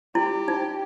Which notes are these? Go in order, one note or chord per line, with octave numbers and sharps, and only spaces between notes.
E4 G4
D#4